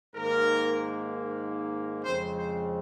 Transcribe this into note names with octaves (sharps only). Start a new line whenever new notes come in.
G#2 D#3 A#3 A#4
F2 C#3 G#3 C4 C5
C5